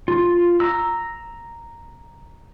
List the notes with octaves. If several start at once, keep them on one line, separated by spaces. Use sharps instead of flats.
F4
A#5 E6